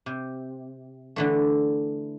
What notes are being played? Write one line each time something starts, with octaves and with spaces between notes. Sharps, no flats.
C3
D3 E3 A3